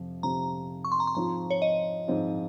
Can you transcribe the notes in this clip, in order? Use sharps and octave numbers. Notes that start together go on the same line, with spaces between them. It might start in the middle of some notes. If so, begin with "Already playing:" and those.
Already playing: F2 C3 F3
F2 C3 F3 A#5
C#6
C6
A#5
C6
G#2 F3 C4 F4 A#5
C#5
D#5
G#2 F3 C4 F4